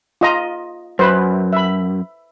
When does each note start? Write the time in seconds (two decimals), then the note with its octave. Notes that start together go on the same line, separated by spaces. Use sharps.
0.21 F4 D#5 A#5
0.99 F#2 B4 C5
1.53 E5 B5